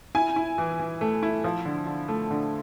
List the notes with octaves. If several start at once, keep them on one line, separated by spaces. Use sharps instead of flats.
E4 G#5
E4
E3
E3
A3
E4
F3
D3
D3
A3
D3